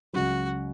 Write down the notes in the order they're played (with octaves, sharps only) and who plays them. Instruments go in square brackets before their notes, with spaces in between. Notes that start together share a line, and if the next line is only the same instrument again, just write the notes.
[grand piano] C#2 C#3 F#3 [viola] F#4